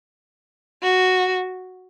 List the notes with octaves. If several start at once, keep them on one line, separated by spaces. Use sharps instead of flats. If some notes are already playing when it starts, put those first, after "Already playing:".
F#4